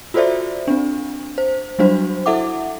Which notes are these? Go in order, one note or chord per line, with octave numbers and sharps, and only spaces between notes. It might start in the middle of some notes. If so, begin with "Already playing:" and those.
F4 F#4 A4 C5 D5 E5
C4 D4
C5
F#3 G3 D4 F#4 C5
E4 A4 E5 F#5 D6